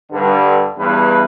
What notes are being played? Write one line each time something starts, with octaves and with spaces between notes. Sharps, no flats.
G2 D3
E2 G2 E3 B4